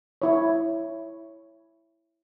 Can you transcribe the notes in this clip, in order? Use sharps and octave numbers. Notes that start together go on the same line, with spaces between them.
E4 C#5